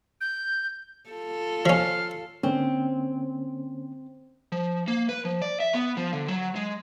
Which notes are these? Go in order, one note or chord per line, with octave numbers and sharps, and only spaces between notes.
G6
F4 A4
F3 C#4 F5
D3 A#3 C4 C#4
F3
A#3
B4
F3
D5
E5
B3
F3
D3
F#3
G#3